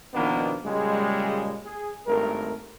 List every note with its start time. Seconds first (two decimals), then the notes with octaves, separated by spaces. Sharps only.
0.14 B2 D#3 F3 A#3 B3 D4
0.65 A#2 C#3 G3 G#3
1.64 G#4
2.07 G#1 G2 A3 A#4